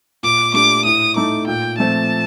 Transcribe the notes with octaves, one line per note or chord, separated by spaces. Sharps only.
A#2 D6
A3 D4 G4 D6
A2 D#6
A3 D#4 A4 D6
A#2 G5
F3 A3 C4 A5